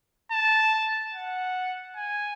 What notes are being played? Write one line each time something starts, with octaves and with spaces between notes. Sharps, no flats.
A5
F#5
G#5